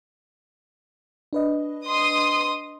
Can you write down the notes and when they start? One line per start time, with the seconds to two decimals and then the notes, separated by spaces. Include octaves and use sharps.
1.33 D4 B4 D#5
1.87 C6 D#6